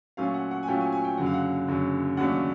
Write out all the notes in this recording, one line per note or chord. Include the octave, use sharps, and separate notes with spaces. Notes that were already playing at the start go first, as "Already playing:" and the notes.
A#2 F#3 A3 C#4 F4 F5
F#5
F#5
G#5
A#2 F#3 A3 C#4 F4 G5
G#5
G#5
G5
F#1 F#2 D3 F#3 F#5
F5
F#5
F#1 F#2 D3 F#3
D#2 C#3 F#3 A3 D4 F#5